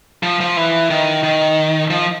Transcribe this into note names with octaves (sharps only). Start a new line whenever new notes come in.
F3
F3
E3
D#3
D#3
F3